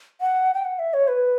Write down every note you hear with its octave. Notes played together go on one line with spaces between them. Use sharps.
F#5
G5
F#5
E5
C#5
B4